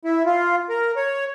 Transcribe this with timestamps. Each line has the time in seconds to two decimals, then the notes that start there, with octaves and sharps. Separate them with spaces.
0.05 E4
0.26 F4
0.69 A#4
0.96 C#5